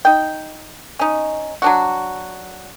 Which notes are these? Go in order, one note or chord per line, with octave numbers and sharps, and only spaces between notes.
D#4 G5
C#4 D#4
F#3 D4 F#4